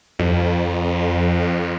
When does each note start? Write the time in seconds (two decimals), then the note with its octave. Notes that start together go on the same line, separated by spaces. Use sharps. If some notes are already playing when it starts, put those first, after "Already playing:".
0.19 F2